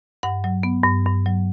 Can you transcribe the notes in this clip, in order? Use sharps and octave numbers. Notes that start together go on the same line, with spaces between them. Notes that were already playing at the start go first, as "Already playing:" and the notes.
G2 F#5
F#3
B3
G2
G2
F#3